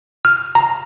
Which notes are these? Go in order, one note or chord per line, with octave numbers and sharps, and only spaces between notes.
F6
A#5